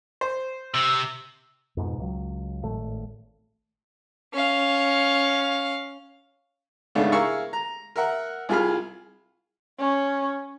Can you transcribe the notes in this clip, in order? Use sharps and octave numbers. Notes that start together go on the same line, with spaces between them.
C5
C3 E6
F2 G#2 B2
C#2 F#3
G#1 A2 A3
C#4 F5
G#2 C#3 A3 B3 D4
E4 G#4 A#4 F5 C#6 E6
A#5
A#4 E5 F#5
C2 F4 G#4 B5 F6
C#4